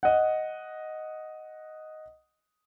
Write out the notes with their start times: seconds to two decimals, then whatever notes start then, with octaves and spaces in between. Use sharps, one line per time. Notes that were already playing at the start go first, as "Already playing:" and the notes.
0.03 D#5 F#5